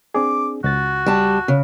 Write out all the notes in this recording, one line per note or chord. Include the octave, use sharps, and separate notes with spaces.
C4 D4 G#4 D6
C#2 F#4 A6
G3 A5
C#3